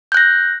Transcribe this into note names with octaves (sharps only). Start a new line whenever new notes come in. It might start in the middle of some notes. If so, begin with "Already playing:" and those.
F#6 G6 A#6